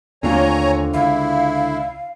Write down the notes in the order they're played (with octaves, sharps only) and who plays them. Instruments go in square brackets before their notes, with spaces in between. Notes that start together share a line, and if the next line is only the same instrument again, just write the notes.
[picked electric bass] D#2 A3 [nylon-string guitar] D3 C4 F4 [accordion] C#5 G#5 A#5
[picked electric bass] C#2 [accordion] E4 [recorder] F5